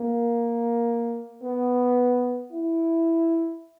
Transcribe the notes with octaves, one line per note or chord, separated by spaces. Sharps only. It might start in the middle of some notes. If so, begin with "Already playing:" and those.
Already playing: A#3
B3
E4